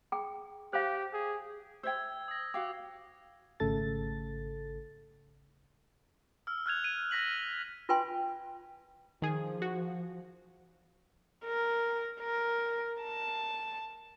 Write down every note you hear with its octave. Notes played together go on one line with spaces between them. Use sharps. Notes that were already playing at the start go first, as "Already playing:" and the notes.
G#4 G5
G4 C5 F5
G#4
C5 E5 G5 E6 G#6
D#6 A#6
F#4 F5 G5 D6
G#1 C#3 A3 A4 A6
E6 F6
F6 F#6 G#6 F7
D#7
F6 A#6 B6 F#7
F4 B4 G5 G#5 C6
D#3 F3 G#4
F#4
A#4
A#4
A5